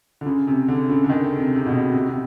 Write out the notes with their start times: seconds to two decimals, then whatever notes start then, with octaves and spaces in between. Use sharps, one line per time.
0.21 D3
0.26 C#3
0.47 C3
0.68 D3
0.89 C#3
1.04 D3
1.10 D#3
1.38 C3
1.55 C3
1.66 B2
1.94 C3
2.07 C3